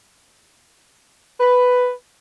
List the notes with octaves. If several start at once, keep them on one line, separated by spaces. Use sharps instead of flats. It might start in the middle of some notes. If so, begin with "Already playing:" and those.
B4